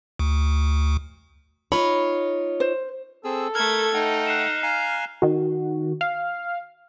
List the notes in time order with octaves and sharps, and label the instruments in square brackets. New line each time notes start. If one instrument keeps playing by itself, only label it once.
[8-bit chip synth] D2
[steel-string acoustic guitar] D#4 F4 C#5 [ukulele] B5
[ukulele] C5
[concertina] C4 G#4 E6 [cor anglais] A4
[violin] A3 G#6 [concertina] A#4 [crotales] F6
[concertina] A3 F#5 G5 [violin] D#4
[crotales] F#6 C7 E7
[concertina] F5 G#5 A#5 [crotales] C7
[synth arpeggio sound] D#3 F#4
F5